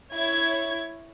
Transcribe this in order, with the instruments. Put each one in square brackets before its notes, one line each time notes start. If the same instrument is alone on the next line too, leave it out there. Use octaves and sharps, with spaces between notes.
[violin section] E4 C#5 G#6